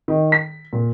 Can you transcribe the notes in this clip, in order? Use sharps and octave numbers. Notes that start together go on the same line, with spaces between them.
D#3
B6
A#2